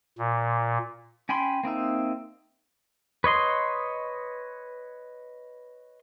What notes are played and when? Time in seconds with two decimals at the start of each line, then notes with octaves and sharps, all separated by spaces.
0.19 A#2
1.29 C#4 G5 G#5 B5 C6
1.63 A#3 C4 D#4 E5
3.24 B4 C#5 D#5 C6